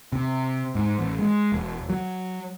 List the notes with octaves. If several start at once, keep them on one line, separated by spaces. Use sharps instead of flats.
C3
G#2
A1
G#3
E1
F#3